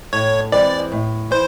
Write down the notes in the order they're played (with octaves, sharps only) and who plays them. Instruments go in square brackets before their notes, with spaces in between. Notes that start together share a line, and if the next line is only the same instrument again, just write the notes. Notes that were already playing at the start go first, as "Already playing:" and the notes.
[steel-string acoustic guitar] A2 [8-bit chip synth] C#5
[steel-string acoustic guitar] E3 G#3 C4 [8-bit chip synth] D5
[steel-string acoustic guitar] A2
[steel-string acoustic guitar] E3 [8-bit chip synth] C5